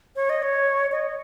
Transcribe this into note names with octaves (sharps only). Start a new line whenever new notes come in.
C#5
D#5
C#5
D#5